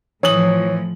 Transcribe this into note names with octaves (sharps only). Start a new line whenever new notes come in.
A2 E3 F3 C#5 D#6 F#7